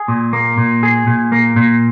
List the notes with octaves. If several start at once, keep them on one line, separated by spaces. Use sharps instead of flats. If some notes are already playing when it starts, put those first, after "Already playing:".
Already playing: G#4
A#2
A#3
A#2
G#4
A#2
A#3
A#2